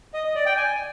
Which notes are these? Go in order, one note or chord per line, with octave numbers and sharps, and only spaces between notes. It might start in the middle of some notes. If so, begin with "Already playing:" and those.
D#5
D#5
D5
G5
G#5